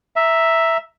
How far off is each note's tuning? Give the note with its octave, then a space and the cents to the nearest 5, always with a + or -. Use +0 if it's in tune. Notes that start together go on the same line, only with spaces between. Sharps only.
E5 +0 A#5 +0